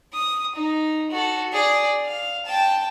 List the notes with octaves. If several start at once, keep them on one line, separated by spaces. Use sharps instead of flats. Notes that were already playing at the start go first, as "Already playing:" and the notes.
D#6
D#4
F#4 A4
G#4 D5
F5
G5 A5